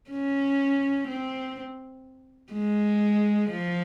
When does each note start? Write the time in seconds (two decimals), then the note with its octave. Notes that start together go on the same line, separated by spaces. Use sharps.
0.10 C#4
1.08 C4
2.53 G#3
3.50 F3